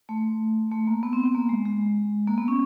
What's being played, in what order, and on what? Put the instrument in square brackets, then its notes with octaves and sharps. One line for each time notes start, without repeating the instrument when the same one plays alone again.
[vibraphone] A3
A3
A#3
B3
C4
B3
A#3
G#3
G#3
A#3
B3
C#4